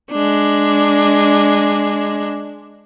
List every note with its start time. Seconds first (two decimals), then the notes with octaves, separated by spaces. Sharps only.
0.11 G#3 D4